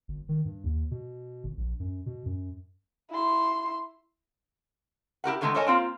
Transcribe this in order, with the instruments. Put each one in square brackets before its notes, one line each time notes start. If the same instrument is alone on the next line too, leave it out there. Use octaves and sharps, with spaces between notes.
[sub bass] G1
D#3
G2
D#2
B2
G1
A#1
F#2
B2
F#2
[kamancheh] E4 C6
[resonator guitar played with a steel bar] E4 G4 A#4 F#5
B2 D3 D#3 G#3 A3 B3
D4 A4 A#4 C#5 D#5 G#5
A#3 C4 F4